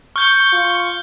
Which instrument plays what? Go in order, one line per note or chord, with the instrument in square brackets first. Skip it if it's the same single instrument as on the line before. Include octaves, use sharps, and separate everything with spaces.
[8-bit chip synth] C#6 [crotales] F6 G6 G7
[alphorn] F4